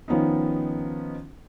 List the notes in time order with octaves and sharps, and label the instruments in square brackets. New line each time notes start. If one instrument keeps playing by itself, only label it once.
[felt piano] D#3 F3 B3 C#4 D#4